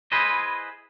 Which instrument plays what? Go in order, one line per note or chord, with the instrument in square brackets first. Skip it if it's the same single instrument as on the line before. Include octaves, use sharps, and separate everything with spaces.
[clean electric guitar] E4 G#4 B4 C5 D#5